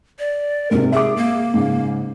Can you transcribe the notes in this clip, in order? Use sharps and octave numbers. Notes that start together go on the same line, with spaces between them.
D5
G#2 C3 A#4
G#4 E5 D6
A#3
G#2 C#3